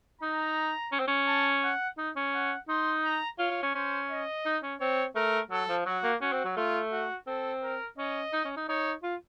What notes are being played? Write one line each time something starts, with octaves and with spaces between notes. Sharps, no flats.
D#4 A#5
C#4
C4
C#4
A5
F#5
D#4
C#4
F#5
D#4 C6
A#5
F4 C#5
F4
C#4
C#4 C5
D#5
D#4
C#4
C4 C#5
A3 A#4
F#3 A4
F3
F#3 F#4
A#3
C#4 F#4
C4
F#3
A3 F4
F#4
C4 A4
A#4
C#4 D#5
D#4
C#4
D#4
D#4 C#5
F4